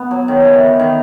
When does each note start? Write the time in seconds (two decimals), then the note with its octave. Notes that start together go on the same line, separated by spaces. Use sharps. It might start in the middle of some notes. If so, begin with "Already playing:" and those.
Already playing: B3
0.11 F#3
0.28 D#3
0.45 E3
0.79 D#3